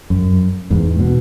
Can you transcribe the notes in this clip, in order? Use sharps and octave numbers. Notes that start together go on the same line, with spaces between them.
F#2
E2 G#2
B2